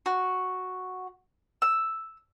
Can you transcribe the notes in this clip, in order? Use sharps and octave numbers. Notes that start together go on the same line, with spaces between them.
F#4
E6